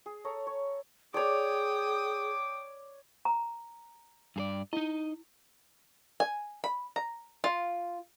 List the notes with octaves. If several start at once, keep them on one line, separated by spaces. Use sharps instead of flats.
G#4
A4 C#5 A#5
C#5
G#4 C#5 D5 G5 D6 D#6
A#5
G2 G#4 D5
D#4 E4 D#5
G#5
B5
A#5
F4